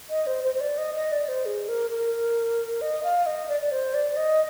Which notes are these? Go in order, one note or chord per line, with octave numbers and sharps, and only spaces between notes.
D#5
C5
C5
C5
D5
D#5
D#5
D5
C5
G#4
A#4
A#4
D#5
F5
D#5
D5
D5
C5
D5
D#5